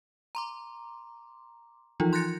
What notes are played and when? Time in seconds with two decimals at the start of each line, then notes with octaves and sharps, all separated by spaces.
0.35 A#5 C6 D6
2.00 E3 F3 D#4 F4
2.13 C6 F#6 G6 A6 A#6 C#7